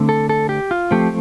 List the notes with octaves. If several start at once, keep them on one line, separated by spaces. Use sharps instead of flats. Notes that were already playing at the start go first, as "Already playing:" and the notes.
Already playing: D3 A3 C4
A4
A4
G4
F4
F3 A3 C4 G4